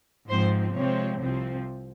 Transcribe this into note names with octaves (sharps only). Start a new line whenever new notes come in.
G#2 F3 C4 C5
C3 F3 G#3 C4 C#5
C2 C3 F3 C4